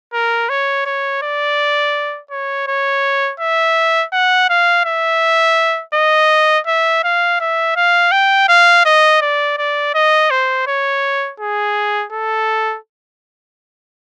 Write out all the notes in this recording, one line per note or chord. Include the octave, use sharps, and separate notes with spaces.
A#4
C#5
C#5
D5
C#5
C#5
E5
F#5
F5
E5
D#5
E5
F5
E5
F5
G5
F5
D#5
D5
D5
D#5
C5
C#5
G#4
A4